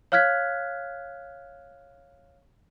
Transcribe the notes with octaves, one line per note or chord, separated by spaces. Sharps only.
C#5 F5 F6 F#6 G#6 B6